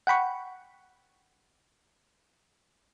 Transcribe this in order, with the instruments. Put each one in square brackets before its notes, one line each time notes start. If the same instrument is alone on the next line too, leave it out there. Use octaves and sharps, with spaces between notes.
[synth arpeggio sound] F#5 G5 B5 C#6